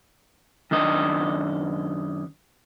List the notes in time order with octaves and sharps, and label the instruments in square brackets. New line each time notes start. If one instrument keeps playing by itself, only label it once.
[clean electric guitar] F#2 D#3 D4 D#5